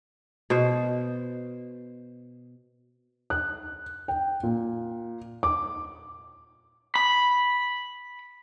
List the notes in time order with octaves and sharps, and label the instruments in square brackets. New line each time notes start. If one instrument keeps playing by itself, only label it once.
[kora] B2 C5
[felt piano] F#6
G5
A#2
D6
[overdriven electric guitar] B5